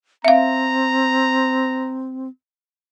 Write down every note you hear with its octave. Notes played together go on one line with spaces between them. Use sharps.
C4 E5 F5 A#5